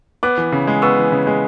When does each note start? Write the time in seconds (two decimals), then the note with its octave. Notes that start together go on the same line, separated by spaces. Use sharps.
0.23 B3 D6 F#6
0.38 E3
0.52 C#3
0.67 G#3
0.82 B3 C#6 E6
0.98 E3
1.12 C#3
1.27 G#3